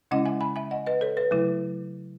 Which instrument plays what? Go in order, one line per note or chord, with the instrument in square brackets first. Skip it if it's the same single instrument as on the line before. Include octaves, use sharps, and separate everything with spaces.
[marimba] C#3 G#3 C#4 E4 D#5 F#5
E5 G#5
G#5 B5
E5 G#5
D#5 F#5
B4 D#5
A4 C#5
B4
C#3 F#3 A3 E4 B4